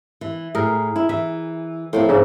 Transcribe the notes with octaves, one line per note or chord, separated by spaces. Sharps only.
E3
A2 G#4 A#4
E4
E3 E5
A2 F3 A#3 C4
G#2 C#3 E4